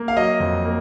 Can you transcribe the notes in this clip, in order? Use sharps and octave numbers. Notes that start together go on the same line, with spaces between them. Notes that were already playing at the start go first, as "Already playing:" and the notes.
Already playing: A#3
F5
F#3 D#5
F2
A#3